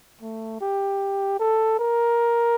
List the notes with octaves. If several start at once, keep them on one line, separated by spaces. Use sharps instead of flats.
A3
G4
A4
A#4